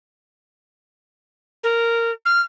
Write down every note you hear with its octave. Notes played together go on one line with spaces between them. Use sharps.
A#4
F6